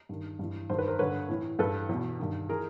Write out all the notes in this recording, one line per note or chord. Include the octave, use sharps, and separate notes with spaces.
G2 D#3
G2 E3
G2 D#3 C5
B4
A#4 C5
G2 D3 B4 C#5
A2 E3
G2 E3 A4 B4
E2 B2
G2 D#3
E3 G#4 A#4